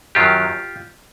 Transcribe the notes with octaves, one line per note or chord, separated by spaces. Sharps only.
F#2 D#3 F#3 F4 G4